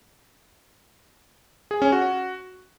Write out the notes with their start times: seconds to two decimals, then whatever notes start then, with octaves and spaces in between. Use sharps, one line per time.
1.71 G#4
1.82 C#4
1.92 F#4